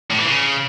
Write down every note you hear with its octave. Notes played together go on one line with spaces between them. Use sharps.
A2
E3
C#3